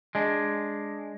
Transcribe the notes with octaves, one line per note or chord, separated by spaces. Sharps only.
G#3 D4